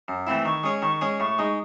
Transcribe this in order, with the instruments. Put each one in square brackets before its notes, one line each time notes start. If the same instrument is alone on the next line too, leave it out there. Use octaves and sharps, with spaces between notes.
[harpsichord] F#2
E3 A3 C4 E4
[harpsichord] D#3 [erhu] C#6
[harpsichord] G#3 C#4 G#4 C#5
[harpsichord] D#3 [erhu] C#6
[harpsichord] G#3 C#4 G#4 C#5
[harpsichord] A2 [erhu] C#6
[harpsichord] G#3 D#4